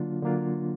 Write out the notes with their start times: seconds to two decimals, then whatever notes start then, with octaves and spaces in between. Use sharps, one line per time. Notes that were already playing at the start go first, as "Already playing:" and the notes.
Already playing: D3 F#3 A#3 D4 F4
0.22 D3 F#3 A#3 D4 F4